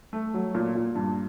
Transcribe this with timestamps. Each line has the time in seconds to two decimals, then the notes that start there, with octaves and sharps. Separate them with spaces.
0.13 A3
0.34 F#3
0.55 A#2
0.75 A#2
0.95 G2